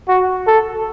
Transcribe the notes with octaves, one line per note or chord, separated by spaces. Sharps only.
F#4
A4